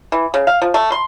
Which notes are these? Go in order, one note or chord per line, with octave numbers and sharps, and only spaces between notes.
E3
C#3
F5
F3
A3
C6